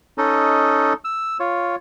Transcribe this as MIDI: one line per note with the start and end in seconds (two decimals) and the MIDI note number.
0.18 0.93 61
0.18 0.93 63
0.18 0.93 69
0.18 0.93 75
1.04 1.37 88
1.40 1.76 65
1.40 1.76 73